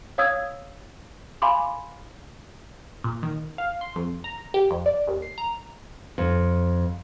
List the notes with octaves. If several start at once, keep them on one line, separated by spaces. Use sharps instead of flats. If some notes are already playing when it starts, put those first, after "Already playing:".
C#5 F5 D#6 E6 G#6
F5 G#5 B5 C6 D6
A#2
D#3
F5
C6
F2
A#5
G4
F2
D5
D#2
C7
A#5
F2